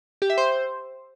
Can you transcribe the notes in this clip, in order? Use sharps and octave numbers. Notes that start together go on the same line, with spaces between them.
G4
E5
C5